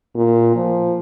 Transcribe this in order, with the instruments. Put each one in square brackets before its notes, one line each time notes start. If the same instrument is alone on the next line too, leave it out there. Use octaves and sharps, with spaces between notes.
[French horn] A#2
F3